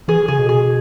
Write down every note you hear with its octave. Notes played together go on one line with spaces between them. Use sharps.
E3 G#4
C#3 G#4
B2
G#4